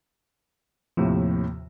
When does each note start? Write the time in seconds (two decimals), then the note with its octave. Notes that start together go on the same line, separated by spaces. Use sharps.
0.97 D#2 A2 C3 F3